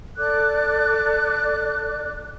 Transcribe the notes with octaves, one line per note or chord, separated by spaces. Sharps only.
A4 D5 D6 F#6